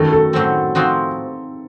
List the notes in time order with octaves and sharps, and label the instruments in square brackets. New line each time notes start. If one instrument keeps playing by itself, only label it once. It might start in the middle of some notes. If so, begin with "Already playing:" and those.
Already playing: [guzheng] F#2 D#3 A3 [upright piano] A4
[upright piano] A4
[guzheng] A2 F#3 C4
F3 C4 D#4 F#4